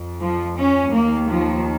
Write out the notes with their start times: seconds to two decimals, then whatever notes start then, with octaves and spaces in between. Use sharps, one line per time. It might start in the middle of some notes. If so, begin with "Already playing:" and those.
Already playing: F2
0.21 F3
0.57 C#4
0.92 D#2 D#3 A#3
1.29 F3